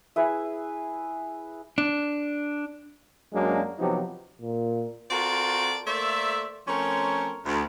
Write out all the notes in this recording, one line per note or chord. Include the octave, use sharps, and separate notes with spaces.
E4 G#4 B4 E5
D4
F#2 F#3 G#3 A#3 D4
C3 F3 F#3 B3 D#4 G4
A#2
C4 F4 F#4 A4 A#4 D5
A3 A#3 C5 D5 E5
F3 A3 C4 C#4 A#4 C#5
D2